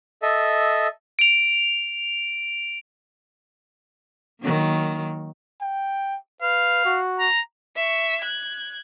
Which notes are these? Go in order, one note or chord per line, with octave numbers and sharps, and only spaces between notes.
A4 D#5 E5
D7 F7
D#3 F#3 A#3
G5
B4 F5
F#4
A#5
E5 C#6
F#6 G#6